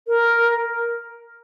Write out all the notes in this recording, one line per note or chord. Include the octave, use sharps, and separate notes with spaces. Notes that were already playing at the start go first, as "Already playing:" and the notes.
A#4